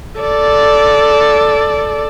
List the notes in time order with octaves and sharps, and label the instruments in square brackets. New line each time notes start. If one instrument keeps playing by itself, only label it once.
[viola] A4 D5